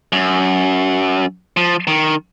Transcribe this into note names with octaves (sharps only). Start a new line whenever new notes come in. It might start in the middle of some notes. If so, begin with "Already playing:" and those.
F#2
F3
D#3